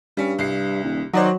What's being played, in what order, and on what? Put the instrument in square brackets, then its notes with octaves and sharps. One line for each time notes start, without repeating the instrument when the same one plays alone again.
[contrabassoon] G2 [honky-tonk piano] G3 C#4
[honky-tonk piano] C2 C7
[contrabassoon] D#1
[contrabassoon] D#3 [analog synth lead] F#3 [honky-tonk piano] C5 D5 D#5